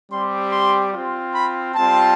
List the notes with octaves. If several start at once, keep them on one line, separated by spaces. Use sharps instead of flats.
G3 C4 G4 C6
C6
F4
C4
B5
G3 C4 F4 A5